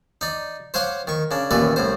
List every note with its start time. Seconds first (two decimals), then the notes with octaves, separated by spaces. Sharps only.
0.21 D#4 D5
0.74 C5 C#5 F5 F#5 C6 D6
1.07 D#3 C#6
1.31 C#3 D4
1.51 A1 D#2 A#2 A3 B4 D5
1.76 C2 A2 C5